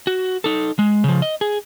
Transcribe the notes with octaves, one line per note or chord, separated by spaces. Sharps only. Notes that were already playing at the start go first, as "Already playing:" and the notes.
F#4
D#4 A4
G#3
C#3 F3
D#5
G#4